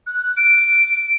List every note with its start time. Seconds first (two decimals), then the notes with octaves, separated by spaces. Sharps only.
0.07 F#6
0.37 D7